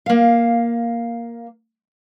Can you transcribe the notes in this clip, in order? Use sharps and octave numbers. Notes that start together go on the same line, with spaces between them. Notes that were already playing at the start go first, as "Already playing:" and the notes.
A#3 F5